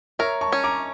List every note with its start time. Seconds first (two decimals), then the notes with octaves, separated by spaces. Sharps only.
0.19 A#4 C#5 E5
0.41 A5 C#6
0.52 C#4
0.64 A#5 D6